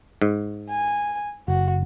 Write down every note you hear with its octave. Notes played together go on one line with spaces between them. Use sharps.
G#2
G#5
F#1 F#4